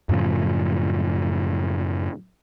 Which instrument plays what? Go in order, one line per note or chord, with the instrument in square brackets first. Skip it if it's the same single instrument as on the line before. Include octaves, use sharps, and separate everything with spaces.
[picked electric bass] F#2 A2 C#3 F3